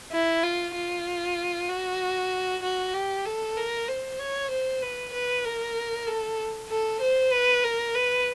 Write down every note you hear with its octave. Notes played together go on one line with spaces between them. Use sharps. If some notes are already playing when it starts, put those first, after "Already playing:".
E4
F4
F4
F#4
F#4
G4
A4
A#4
C5
C#5
C5
B4
B4
A#4
A4
A4
C5
B4
A#4
B4